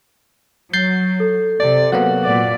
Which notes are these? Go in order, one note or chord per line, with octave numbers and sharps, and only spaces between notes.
F#3 G6 A6 C7
A4
C3 D5
F#3 A#3 B3 F#4
A#2 D5